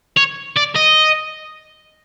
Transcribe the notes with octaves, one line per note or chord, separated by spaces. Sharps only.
C#5
D5
D#5